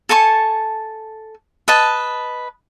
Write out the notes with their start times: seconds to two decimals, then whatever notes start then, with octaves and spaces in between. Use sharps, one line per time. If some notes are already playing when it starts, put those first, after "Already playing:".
0.09 A4 G#5 A5 C#6
1.68 B4 D#5 A5